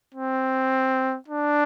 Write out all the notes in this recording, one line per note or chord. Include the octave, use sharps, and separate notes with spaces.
C4
D4